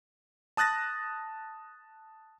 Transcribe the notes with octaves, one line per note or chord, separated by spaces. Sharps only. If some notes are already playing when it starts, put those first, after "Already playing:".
A5 D#6 F#6 A6 A#6